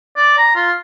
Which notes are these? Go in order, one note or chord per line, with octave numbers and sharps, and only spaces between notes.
D5
A#5
F4